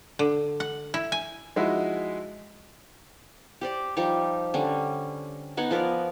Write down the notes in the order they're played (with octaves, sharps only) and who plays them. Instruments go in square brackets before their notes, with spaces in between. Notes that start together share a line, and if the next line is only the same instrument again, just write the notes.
[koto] D3
F#5
E4
G#5
[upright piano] F3 G#3 D#4 E4 F#4
[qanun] G4 C5 D5
F3 G3 D#4 G4
D3 G3 C#4
B3 D#4 F#5 G#5
F3 B3 A#4 D5